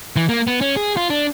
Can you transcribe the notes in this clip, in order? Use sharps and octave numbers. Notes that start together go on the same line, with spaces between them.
E3
A#3
B3
C#4
G#4
F4
D4